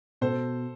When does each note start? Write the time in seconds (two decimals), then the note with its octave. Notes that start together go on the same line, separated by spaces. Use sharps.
0.21 B2 A4 C5